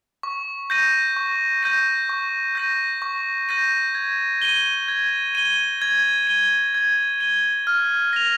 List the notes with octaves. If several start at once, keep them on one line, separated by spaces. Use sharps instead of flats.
C#6
G6 A#6 D#7
C#6
G6 A#6 D#7
C#6
G6 A#6 D#7
C#6
G6 A#6 D#7
G#6
D#7 G7
G#6
D#7 G7
G#6
D#7 G7
G#6
D#7 G7
F6
A#6 F7